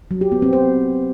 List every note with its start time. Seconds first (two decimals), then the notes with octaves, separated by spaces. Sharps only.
0.11 F#3
0.21 G4
0.32 B3
0.42 C4
0.53 C5